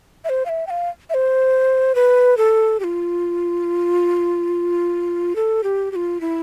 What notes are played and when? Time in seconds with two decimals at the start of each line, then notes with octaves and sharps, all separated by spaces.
0.25 E5
0.29 C5
0.46 F5
0.49 E5
0.67 G5
0.70 F5
1.10 E5
1.14 C5
1.95 B4
2.37 A4
2.80 G4
2.84 F4
5.36 A4
5.64 G4
5.92 G4
5.96 F4
6.21 E4